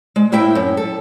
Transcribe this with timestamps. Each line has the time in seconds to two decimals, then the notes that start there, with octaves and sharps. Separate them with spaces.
0.16 G#3
0.32 A2 A#3 E4 E5 G5
0.55 F#2
0.77 A4